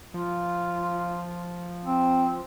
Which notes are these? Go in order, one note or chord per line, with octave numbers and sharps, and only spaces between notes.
F3 F4
C4